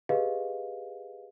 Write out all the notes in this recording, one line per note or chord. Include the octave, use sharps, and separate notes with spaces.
G4 G#4 B4 D#5 F5